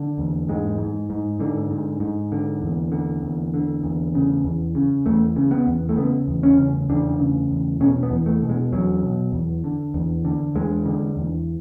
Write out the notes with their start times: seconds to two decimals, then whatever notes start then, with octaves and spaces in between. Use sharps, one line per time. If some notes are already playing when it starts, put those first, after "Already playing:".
Already playing: D3
0.18 E2
0.48 G#2 G#3
0.78 G#2
1.10 G#2
1.40 G#2 D3
1.71 G#2
2.00 G#2
2.32 D3
2.62 E2
2.92 D3
3.23 E2
3.54 D3
3.83 E2
4.15 C#3
4.44 E2
4.75 C#3
5.06 E2 A3
5.36 C#3
5.51 B3
5.67 E2
5.89 A3
5.97 C#3 B3
6.28 E2
6.43 C#4
6.58 C#3
6.89 E2 D4
7.20 C#3
7.50 E2
7.80 B2 C#4
8.03 B3
8.11 E2
8.26 A3
8.42 B2
8.49 G#3
8.72 E2 F#3
9.03 B2
9.32 E2
9.64 D3
9.94 E2
10.25 D3
10.55 E2 G#3
10.86 D3
11.17 E2